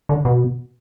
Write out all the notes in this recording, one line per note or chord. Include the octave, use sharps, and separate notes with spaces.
D3
B2